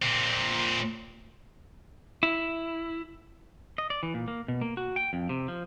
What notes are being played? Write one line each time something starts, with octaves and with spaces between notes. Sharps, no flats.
A#2 C4
E4
D#5
D5
E3
A#2
A#3
B2
A#3
F#4
G5
F2
C3
F3